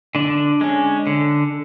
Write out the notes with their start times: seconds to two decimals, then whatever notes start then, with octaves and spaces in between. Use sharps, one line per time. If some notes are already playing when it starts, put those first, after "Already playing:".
0.15 D3 D4
0.61 G#3 C#4
1.07 D3